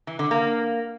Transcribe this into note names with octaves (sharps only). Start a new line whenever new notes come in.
E3
D3
A#3